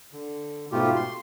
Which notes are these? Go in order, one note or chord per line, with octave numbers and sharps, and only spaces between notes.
D3
G#2 B2 A3 F4 G4
C6